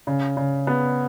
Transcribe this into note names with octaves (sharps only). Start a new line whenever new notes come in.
C#3
C#3
B3